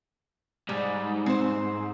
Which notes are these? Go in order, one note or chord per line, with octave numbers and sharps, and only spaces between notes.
G#2 G3
C4 C5